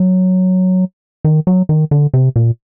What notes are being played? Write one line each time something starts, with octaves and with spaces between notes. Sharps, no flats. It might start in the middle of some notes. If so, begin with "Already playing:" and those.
Already playing: F#3
D#3
F#3
D#3
D3
C3
A#2